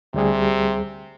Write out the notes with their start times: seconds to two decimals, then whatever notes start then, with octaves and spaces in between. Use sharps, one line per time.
0.14 D2 C3 G3 G#4